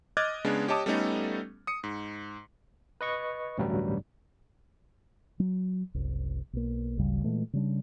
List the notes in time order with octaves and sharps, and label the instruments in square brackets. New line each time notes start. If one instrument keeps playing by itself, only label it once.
[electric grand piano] D#5 D6 F6 F#6 G#6 A6
C#3 G#3 B3 D4
G4 C#5 D#5 A5 D6 D#6
G3 A3 B3 C#4 D#4 A4
D#6 C#7
G#2
[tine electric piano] B4 D#5 C#6
A1 D2 G2 F#3 G3
[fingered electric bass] F#3
F#1 C2
B1 A#3
G#1 D2 C#3 G3
A#2 E3 G#3 A3
C#3 G3 D4